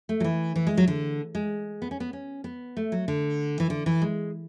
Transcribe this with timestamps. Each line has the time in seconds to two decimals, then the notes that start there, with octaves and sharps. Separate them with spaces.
0.09 A3
0.20 F#3
0.24 E3
0.56 E3
0.67 G#3
0.78 F#3
0.88 D3
1.35 G#3
1.82 B3
1.91 C#4
2.00 B3
2.13 C#4
2.44 B3
2.77 A3
2.92 F#3
3.08 D3
3.60 E3
3.70 D3
3.86 E3
4.02 G#3